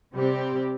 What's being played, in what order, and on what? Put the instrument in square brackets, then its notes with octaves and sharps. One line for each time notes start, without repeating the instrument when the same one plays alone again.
[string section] C3 G3 C4 G4